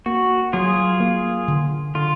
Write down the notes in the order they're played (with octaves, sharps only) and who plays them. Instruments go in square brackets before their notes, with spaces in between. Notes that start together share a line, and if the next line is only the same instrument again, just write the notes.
[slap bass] A#3 [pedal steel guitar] F#4
[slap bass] F#3 [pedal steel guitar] F4 G#4
[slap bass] A#3
D3
[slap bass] D3 [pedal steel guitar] F4